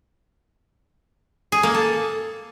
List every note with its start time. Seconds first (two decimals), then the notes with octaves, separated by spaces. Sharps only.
1.52 G#4
1.63 A#3
1.75 A4